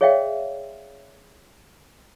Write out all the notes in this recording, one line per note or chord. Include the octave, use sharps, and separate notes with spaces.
G#4 C#5 D5 E5 F5 G5